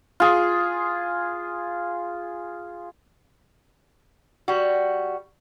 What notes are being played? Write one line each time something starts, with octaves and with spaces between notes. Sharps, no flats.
F4 G#4
G3 F#4